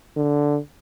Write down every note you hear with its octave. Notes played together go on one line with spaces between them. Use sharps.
D3